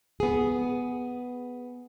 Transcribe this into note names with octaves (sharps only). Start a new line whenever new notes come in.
B3 G#4